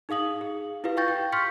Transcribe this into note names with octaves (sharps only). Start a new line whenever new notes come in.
D#4 G#4 F5 D#6 F#7
G#4
E4 F4 G4 B4 F5
F5 G5 C#6 G6 A6 A#6
G5
C6 C#6 F6 G6 B6 C#7